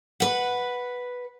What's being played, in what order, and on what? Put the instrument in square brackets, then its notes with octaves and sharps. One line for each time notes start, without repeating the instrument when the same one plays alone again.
[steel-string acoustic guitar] B4 F#5